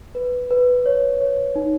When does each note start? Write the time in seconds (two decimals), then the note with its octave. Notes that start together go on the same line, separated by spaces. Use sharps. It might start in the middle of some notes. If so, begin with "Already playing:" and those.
0.15 B4
0.51 B4
0.86 C#5
1.21 C#5
1.55 D#4